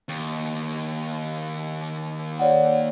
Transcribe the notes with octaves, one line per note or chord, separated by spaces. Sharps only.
D#2
C#5 D5 F#5